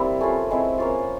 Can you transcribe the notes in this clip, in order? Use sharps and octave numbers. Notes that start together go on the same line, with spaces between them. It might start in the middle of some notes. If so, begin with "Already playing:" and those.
Already playing: G3 A#3 C4 E4
A3 C#4 F4 G#5
G#3 C4 E4
A#3 C#4 F4